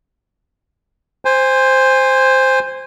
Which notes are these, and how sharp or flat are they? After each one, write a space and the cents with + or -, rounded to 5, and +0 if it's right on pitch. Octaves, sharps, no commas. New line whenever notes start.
C5 +0 G#5 -25